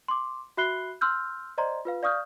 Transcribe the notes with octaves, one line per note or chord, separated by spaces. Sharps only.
C6 D6
F#4 E5 B5 F#6 C7 G7
C6 E6 F6 G6
C5 D5 D#5 A#5 C6
F4 B4 F5
D5 F5 C#6 D#6 F6 G6